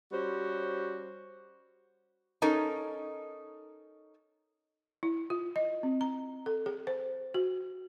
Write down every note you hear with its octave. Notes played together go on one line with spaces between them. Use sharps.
G3 C#4 F#4 C5
C#4 D#4 A4 A#4 D#5
E4
F4
D#5
C4
A#5
A4
G#4
C5
F#4